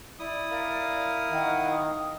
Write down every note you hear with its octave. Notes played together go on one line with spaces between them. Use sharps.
E4 D5 D#6
A#4 F5
D#3 F#5
D#6